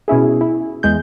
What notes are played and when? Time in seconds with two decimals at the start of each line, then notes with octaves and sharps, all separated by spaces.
0.08 B2 C#4 E4 G#4
0.41 E4
0.83 E2 G#3 G6